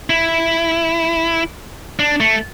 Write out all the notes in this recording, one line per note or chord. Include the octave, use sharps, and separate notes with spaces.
E4
D4
A3